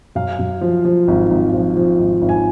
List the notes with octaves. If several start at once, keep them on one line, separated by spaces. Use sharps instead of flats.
F#2 F5
F#2
F3
F3
G#1
G#1
F3
F3
G#1
G#1
G#5